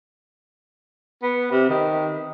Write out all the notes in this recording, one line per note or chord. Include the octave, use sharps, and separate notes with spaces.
B3
C3
D#3